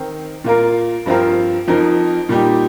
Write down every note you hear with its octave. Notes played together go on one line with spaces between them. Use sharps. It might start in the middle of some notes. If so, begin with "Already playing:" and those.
Already playing: D#3 C4 D#4 A#4
A#2 A#3 F4 A#4
G2 F3 C4 F4 A#4
F2 F3 D#4 A#4
A#2 G3 D#4 G4